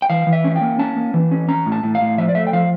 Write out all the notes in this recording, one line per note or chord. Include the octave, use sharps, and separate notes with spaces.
G5
E3 F5
E3
E5
C#4
G5
A#3
C#4 A5
A#3
E3
C#4
C#4 A#5
A2
A5
A2
F5
A2
F3 E5
D5
A3 E5
G5
F3 F5